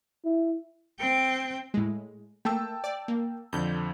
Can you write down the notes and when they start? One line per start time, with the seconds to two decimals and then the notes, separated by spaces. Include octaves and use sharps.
0.24 E4
0.99 C4 G5
1.74 A2 G#3
2.45 A3 A#3 G5 A5 E6
2.84 D5
3.08 A#3
3.53 F2 D3 F3 G6